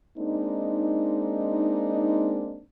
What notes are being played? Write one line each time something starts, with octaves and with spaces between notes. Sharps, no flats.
G#3 A#3 C4 D4 D#4